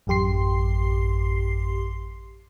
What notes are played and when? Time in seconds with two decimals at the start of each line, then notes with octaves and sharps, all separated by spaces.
0.07 A1 F#2 G4 C6 C7